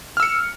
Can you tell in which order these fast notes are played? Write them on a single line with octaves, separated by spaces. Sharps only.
F6 E6 C#7